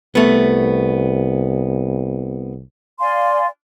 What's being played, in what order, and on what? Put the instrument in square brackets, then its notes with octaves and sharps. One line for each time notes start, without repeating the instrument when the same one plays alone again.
[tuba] C2 [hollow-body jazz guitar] A3 B3
[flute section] D5 F5 G#5 C6